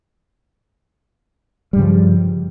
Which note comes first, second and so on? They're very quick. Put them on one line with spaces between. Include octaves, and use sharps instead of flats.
G3 G2 C#3 F3